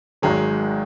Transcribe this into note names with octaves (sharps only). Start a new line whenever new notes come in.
G#1 G#2 D#3 F#3 G#3